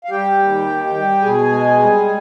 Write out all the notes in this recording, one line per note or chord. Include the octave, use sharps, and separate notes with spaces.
F5
G3 G4 G5
D#2
D#3
G3
B2 G#4 G#5
G#3
G3